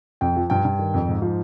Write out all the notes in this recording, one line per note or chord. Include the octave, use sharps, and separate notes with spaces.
F2 G5
F3
G2 G5
G2
D#3
F2
G#2
F3